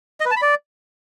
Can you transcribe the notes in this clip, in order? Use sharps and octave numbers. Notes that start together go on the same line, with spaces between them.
D#5
B4
A5
B5
D5